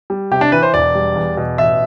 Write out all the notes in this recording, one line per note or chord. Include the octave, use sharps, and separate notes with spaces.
G3
C3 G4
D4
E3 B4
C5
E1 D5
G3
E2
B2
A1 E5